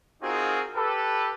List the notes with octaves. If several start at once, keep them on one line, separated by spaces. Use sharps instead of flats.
C4 D#4 F4 F#4 G#4 A#4
G4 A4 B4